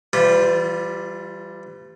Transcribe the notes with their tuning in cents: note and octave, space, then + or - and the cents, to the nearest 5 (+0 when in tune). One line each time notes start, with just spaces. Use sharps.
E3 +35 G3 +0 F4 -5